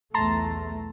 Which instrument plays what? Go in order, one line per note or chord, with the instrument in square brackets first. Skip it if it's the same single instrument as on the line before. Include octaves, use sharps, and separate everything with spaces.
[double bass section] B1 E2 A3 [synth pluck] A5 A#5 C6